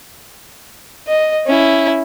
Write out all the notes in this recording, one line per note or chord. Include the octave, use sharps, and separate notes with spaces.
D#5
C#4 E4